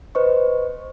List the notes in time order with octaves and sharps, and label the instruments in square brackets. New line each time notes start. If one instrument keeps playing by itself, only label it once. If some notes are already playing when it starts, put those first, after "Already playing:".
[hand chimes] B4 C5 D#5 C#6